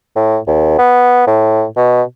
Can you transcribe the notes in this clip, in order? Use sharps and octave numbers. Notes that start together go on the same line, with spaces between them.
A2
D#2
B3
A2
B2